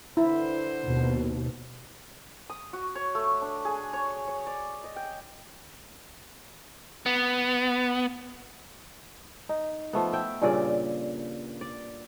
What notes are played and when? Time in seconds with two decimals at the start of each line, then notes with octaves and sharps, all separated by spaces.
0.17 D3 B3 E4 C5
0.84 D#2 B2
2.50 D#6
2.73 F#4
2.95 C#5
3.15 A3
3.42 D4
3.65 G#4
3.93 C#5
4.27 C#5
4.47 D5
4.84 D#5
4.96 G5
7.06 B3
9.49 D#4
9.93 F3 A3 B3
10.13 E5 G5
10.42 G2 A#2 C#3 D5
11.61 D5